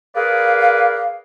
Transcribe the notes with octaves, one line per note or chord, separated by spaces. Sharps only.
G#4 A#4 B4 D5 F5